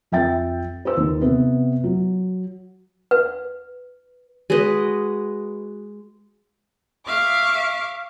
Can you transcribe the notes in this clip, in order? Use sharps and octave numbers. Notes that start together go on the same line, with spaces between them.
F2 E5 G5 A6
B4 C5 E6
D#2
C3 B3
F#3
B4
G#3 F#4 B4 D#5
E5 F5 C#6 D6